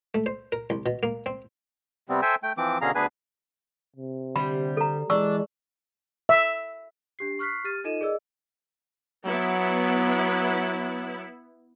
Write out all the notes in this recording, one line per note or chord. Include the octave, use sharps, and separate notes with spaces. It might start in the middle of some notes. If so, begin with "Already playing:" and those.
A3
C5
A#4
C2
B2
A#3
C4
C3 G3 B3 C4
A4 C5 E5 G5 G#5
A3 G5
E3 F3 C4 D6
B2 D3 C#4 G#4 F5 A#5
D2 B3 D4 G#4 B4 G#5
C3
D3 G3 C5 B5
A4 A#5
E3 G#3 D4 E4 C#6 E6
E5
D4 G4 C7
C#6 F6 F#6 B6 C7
G4 F6 A6 D#7
D#4 F4 A4 D#5 D#7 E7
G#4 A#4 D5 D#5 E6
F#3 B3 E4